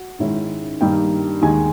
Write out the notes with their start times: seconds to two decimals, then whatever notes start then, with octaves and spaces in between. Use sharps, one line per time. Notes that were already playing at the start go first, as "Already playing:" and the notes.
Already playing: F#4
0.19 G#2 D#3 G#3 C#4 E4
0.81 G2 D#3 G3 A#3 D#4 G4 G5
1.42 D#2 D#3 G#3 G#4 G#5